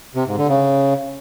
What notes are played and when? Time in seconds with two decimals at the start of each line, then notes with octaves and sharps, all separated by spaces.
0.15 C3
0.26 G#2
0.38 D3
0.49 C#3